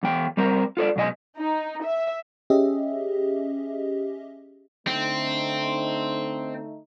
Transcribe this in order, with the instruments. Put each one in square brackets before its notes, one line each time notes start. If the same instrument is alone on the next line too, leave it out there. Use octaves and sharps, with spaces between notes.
[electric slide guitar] E2 E3 G5
G3 C4 A#4
F4 A4 C#5 D5
F#2 B2 C4 D#5 G#5
[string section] D#4
E5
[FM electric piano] C#4 G4 G#4 D#5 E5
[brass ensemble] D3 A3 D#4 [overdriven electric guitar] C4